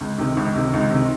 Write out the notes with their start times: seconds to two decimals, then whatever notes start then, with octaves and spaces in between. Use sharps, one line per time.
0.01 C#2
0.18 C3 D#3
0.37 C#2
0.55 C3 D#3
0.74 C#2
0.90 C3 D#3